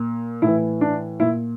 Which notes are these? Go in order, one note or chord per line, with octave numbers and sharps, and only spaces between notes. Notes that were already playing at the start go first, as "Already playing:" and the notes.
Already playing: A#2
A2 E3 E4
D4
A#2 E4